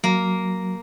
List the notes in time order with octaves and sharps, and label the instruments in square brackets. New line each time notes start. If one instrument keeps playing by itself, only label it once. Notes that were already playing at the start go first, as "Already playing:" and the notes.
[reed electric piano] F#3 [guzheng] A#3